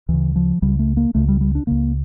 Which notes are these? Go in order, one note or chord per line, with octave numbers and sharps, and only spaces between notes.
D2 C#3 E3
F3
C#2 C#3 G3
A3
A#3
C#2 C#3 A3
G3
G3
D4
C#2 C#3 A#3